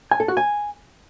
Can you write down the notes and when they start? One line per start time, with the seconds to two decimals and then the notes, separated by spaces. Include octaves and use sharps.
0.11 G#5
0.20 A4
0.28 F#4
0.37 G#5